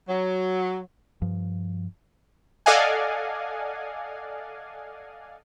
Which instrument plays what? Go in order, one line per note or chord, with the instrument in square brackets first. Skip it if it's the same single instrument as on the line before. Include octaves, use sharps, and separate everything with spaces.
[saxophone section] F#3
[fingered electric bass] G2 F3
[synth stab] A4 D5 D#5 F5 F#5 G#5